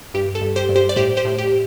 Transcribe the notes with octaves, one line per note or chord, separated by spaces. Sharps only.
G2 G4
A4
G2
G4 C5
G2
G4 C5
D5
A2 G4 C5
G4 C5
A2
G4